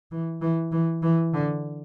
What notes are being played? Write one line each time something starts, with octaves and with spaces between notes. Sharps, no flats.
E3
E3
E3
E3
D3